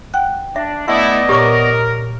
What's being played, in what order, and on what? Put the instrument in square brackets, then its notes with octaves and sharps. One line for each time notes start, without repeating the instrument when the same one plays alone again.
[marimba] F#5 G5 F#6
[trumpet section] D4 [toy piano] E5
[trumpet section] A3 E4 [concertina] B3 D5 D#5 [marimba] F#5
[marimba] A#2 C#5 [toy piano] G4 C#6 D6 [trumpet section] A#4